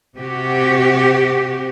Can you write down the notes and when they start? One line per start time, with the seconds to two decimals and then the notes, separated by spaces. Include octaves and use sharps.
0.18 C3 F#4 G4